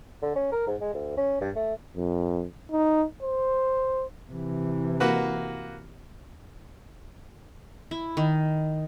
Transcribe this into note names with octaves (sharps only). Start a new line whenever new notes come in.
D3
C#4
A#4
G#2
G#3
D2
C#4
G2
A3
F2
D#4
C5
C3 E3
A#3 F#4 B4
E4
D#3